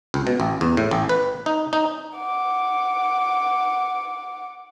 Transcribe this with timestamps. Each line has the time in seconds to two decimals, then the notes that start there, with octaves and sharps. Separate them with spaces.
0.14 C#2
0.27 B2
0.40 A1
0.61 E2
0.77 A2
0.91 A1
1.09 B4
1.46 D#4
1.73 D#4
2.15 F#5 D6